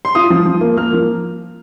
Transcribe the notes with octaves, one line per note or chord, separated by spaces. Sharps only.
C6
F4 D#6
F3
F3
A#3
A#3 F6
F3